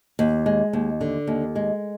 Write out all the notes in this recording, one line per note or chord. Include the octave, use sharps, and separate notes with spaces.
D#2
G#3
D#2
D3
D#2
G#3